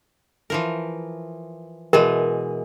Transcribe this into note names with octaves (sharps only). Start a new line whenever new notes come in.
E3 F3 A#4
B2 E3 G#3 A#4